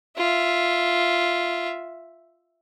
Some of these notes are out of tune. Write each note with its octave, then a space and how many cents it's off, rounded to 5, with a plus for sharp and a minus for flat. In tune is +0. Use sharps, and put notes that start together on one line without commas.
F4 +0 E5 +0